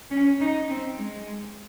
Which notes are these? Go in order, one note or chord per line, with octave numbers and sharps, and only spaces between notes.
C#4
D#4
C4
G#3